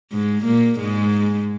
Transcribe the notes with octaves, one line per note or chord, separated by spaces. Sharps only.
G#2 G#3
A#2 A#3
G#2 G#3